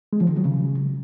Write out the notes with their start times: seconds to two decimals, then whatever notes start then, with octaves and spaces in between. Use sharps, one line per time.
0.13 G#3
0.21 F3
0.29 D#3
0.37 F#3
0.45 C#3